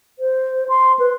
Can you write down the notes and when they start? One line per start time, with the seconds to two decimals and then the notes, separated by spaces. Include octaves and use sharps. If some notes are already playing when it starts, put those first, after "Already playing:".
0.19 C5
0.69 C6
0.99 B4